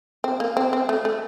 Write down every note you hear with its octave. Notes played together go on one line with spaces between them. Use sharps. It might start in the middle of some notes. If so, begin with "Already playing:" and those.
C4
A#3
C4
C4
A3
A3